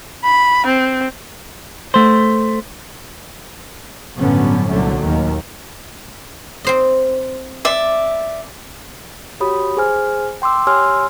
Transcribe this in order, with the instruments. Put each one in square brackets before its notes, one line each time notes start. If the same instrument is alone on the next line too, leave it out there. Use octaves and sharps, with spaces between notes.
[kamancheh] B5
C4
[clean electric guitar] A3 C5
[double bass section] G1 A2 D3 F#3 B3 C#4
C2 A#2 D3 F#3 A3
D#2 D#3
[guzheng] C4 C5 D#5
[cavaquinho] D5 E5
[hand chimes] F#4 G4 C#5 B5 D#6
G#4 C5 G#5 F6
G5 C6 D6 E6
G4 C#5 G#5 C6 E6 F6